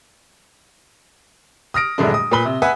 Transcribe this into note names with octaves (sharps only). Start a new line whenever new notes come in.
D#6 F6 A#6 D7
D#1 F#2 D3 G#3 A3 D4
D#6
A#2 B4 B5 G7
C3
B4 E5 F#5 G#5